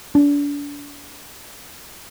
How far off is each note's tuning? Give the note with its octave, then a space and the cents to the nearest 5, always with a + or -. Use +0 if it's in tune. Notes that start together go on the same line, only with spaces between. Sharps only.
D4 -35